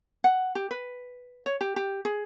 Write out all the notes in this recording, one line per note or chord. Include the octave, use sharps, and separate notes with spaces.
F#5
G4
B4
C#5
G4
G4
G#4